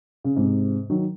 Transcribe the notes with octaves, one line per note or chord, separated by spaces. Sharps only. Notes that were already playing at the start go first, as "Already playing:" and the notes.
C#3
G#2 C3
D#3 F#3